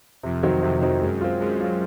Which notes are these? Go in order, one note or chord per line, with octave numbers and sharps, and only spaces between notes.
F2 C3
D#3 F#3 C4 D#4
F2 C3
D#3 F#3 C4 D#4
F#2 G#3
C4 F4
F#2 G#3
C4 F4